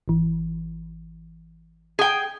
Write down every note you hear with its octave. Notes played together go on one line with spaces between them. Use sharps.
G#1 E3
G#4 G5